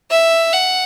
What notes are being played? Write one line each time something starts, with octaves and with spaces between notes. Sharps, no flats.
E5
F#5